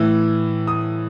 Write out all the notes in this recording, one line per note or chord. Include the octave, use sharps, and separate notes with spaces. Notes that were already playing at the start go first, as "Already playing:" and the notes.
Already playing: A2 E3 E6
D#6